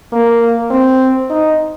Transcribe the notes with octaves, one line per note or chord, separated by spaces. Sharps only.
A#3
C4
D#4